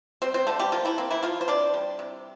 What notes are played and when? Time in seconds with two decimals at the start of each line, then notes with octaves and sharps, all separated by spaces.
0.22 G3 C4 C5
0.34 C4 C5
0.47 D3 A3 A4
0.59 G3 G4
0.72 F3 A#3 F4
0.85 E3 E4
0.98 A#3 C4
1.11 E3 E4
1.23 E3 F3 F4
1.41 C5
1.48 C3 D4 D5
1.74 G3
1.99 C3